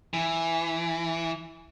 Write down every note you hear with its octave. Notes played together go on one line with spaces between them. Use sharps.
E3